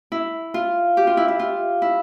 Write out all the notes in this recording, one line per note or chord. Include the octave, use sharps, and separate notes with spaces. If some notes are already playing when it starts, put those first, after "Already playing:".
E4
F4
G4
F4
E4
E4
F4
E4